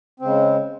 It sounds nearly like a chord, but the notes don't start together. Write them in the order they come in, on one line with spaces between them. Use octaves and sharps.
C4 C#3 G#3